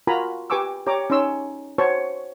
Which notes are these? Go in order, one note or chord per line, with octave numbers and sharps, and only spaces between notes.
F4 F#4 A#4 G#5 A#5 B5
G4 B4 G#5 C#6 D6 E6
G4 C#5 A#5 D6
C#4 D#4 C#5 C6 E6
F#4 C5 C#5 A5 C#6